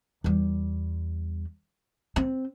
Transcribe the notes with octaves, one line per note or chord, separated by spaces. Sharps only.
E2 G3
C4